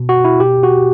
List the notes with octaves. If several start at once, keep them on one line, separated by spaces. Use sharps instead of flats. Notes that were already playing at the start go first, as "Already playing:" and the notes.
Already playing: B2
F#4
E4
B2 G4
F#4